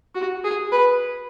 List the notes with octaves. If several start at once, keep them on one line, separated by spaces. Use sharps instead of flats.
F#4
G#4
B4